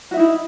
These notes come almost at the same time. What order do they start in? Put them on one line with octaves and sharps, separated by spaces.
F#4 E5 D#4 E4